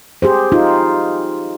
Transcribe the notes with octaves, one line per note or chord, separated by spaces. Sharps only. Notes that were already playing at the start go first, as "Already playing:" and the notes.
G4 G#4 C5
D#4 F4